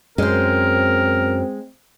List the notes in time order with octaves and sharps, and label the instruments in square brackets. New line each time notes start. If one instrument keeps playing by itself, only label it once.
[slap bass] F#2 [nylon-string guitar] G#3 C5 [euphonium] C4 [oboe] A#4